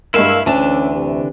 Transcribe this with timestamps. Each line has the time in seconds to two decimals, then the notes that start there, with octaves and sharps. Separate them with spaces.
0.14 G2 G#3 A#3 E4 E5 F5
0.46 D2 D3 E3 C#4 D4 E5 A5
0.95 C3